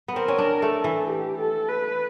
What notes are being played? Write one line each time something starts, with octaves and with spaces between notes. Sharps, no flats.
B3
C4 A#4
C#4
D4
A3 A4
E3
G4
A4
B4